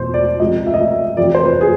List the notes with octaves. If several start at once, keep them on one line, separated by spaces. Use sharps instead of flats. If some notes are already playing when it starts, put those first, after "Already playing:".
Already playing: E2 B2 C5
D5
C#2 C3 F3 D#5
E5
D#5
E5
E5
F2 C3 E3 D5
C5
B4
G#4